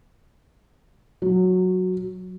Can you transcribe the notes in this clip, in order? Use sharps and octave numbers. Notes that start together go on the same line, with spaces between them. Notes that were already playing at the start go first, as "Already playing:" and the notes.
F#3